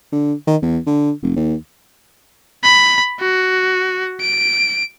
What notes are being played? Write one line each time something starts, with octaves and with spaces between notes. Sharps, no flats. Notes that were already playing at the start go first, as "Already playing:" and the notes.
D3
D#3
E2
D3
F1
D#2
B5
F#4
D7